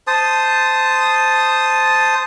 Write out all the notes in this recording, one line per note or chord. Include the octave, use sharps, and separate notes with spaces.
C5 A5 D#6